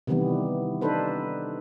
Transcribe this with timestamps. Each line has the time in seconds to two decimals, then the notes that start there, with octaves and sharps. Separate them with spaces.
0.07 C3 D#3 E3 G3 B3
0.81 D4 D#4 A4 B4 C5